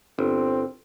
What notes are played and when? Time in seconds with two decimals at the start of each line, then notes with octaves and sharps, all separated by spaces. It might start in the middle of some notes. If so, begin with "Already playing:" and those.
0.19 G1 C4